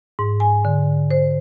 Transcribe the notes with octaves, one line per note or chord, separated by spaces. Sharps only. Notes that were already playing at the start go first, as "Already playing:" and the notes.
G#2
G#5
D3
C5